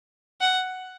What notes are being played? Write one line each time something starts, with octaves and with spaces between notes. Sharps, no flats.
F#5